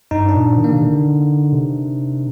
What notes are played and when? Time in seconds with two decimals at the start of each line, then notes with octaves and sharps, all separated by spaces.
0.11 G2 D#4
0.29 D4
0.35 A#2
0.58 D#3
0.64 A#3
0.71 C3
0.82 D3
1.53 C3